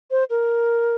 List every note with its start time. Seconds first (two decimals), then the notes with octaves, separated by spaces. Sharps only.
0.11 C5
0.30 A#4